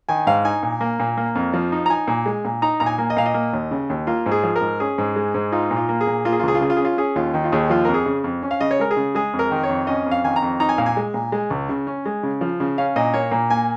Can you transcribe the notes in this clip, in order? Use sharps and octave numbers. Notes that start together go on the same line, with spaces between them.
D#3 G#5
G#2 F5
D#4 G#5
A#2
A#3
A#2
A#3
F2
F3
D#4
A#5
D#4 G#5
A#2
G#3
A#2
D#4 A#5
A#2 A#5
G#5
A#3
D#5
A#2 F5
D#5
A#3
D#2
C#3
D#2
A#3 F4
G#2
G#4
F3
A#4
G#2
C#4 G#4
G#2
G#3
G#2
D#4 F4
A#2
F4
A#3
G#4
A#2
A#3 F4
G#4
F4
C#2 G#4
F4
C#3 G#4
F4
G#4
C#4 F4
C#4 G#4
D#2 F4
D#3
F4
D#2 G#4
F3 F4
F2 A#4
G#4
C#3
F2
C#4
F5
C#3 D#5
C#5
G#3 A#4
G#4
C#3
G#3 G#4
F2
A#4
D#3
C#5
F2
C#4 D#5
F2
F5
D#3 G#5
A#5
F2
D#4 A#5
G#5
A#2 F5
G#5
G#3
A#2
G#3
C#2
C#3
C#4
G#3
C#3
F3
C#3
C#4 F5
A#2 D#5
A#3 C#5
A#2
A#3 G#5